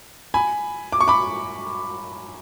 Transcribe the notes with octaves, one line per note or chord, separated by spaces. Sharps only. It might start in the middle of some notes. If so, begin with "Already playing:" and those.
G#5 B5
D6
C#6
B5 D6